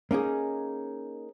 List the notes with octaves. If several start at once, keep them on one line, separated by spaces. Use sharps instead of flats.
A#3 C#4 D#4 G#4